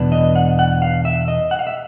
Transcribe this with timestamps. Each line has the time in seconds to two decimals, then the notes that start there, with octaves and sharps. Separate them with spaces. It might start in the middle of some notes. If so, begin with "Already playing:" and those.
Already playing: E2 B2 B3 D4
0.12 D#5
0.35 F#5
0.59 F#5
0.82 F5
1.05 E5
1.28 D#5
1.51 F#5
1.59 F5
1.67 E5